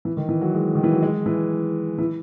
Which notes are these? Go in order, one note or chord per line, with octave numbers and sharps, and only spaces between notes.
E3
D#3
E3
F#3
G#3
D#3
E3
F#3
G#3
E3
E3